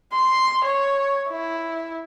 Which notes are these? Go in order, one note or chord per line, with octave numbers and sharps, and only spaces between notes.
C6
C#5
E4